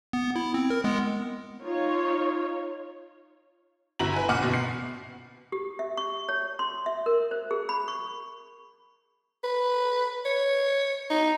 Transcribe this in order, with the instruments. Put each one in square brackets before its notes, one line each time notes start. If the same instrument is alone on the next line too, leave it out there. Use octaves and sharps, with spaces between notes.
[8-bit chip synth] B3
E4
C4
A#4
G#3 B3
[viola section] D#4 F4 C#5
[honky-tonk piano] G1 E4 F#4 A#5 F#7
B4 G#5
F#1 A#2 F#5 D6 F6 F#7
G1 B2
C7
[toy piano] G4
E5
C#6
C#5
C6
E5
A#4
C5
G#4
B5
C#6
[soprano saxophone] B4
C#5
D#4